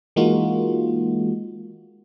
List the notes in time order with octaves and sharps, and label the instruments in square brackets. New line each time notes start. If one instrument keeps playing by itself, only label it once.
[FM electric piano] E3 G#3 A#3 D#4 F4 F#4